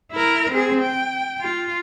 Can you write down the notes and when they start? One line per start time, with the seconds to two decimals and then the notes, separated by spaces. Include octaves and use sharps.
0.12 E4 A#4
0.51 C4 G#4
0.81 G5
1.41 F4